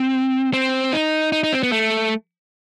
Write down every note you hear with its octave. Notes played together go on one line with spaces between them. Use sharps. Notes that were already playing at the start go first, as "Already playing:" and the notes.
Already playing: C4
C4
D#4
D#4
D#4
C4
B3
A3